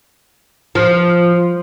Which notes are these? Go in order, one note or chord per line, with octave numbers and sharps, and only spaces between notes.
F3